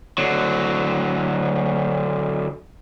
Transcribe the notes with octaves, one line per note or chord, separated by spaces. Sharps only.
D3 F#3